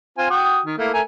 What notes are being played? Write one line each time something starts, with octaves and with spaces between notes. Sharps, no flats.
C4 F4 G#5
F#4 G5 D#6
D#3
A3 A#3 E4
A3 A#4 G#5